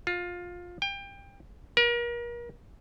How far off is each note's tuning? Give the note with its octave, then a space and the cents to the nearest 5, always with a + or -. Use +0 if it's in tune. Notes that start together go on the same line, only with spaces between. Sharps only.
F4 +15
G5 +25
A#4 +35